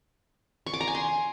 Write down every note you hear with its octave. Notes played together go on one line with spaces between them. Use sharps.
C#6
D6
A#5
G#5
C6